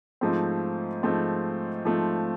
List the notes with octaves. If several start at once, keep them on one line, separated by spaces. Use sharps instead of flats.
G#2 F3 A3 C4
G#2 F3 A3 C4
G#2 F3 A3 C4